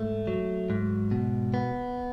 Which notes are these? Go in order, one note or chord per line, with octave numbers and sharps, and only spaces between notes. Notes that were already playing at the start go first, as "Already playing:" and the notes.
Already playing: G#2 A3
F#3
G#2
B2
B3